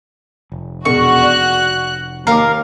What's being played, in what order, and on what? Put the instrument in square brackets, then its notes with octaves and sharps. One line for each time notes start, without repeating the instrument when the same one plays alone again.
[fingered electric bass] F1
[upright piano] E1 [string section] F#4 F#6 [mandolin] C#6
[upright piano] D5
[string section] D#2 [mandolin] A#4 F5 [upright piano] D6 C7